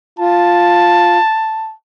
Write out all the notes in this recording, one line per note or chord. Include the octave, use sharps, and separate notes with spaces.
F4 A5